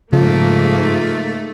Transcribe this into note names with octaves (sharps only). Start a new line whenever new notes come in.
G#2 C#3 F3 A3 A#3